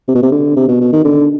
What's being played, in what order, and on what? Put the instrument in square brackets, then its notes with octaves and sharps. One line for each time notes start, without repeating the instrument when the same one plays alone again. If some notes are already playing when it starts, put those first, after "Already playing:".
[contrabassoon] C3
B2
C3
D3
C3
B2
B2
D#3
D3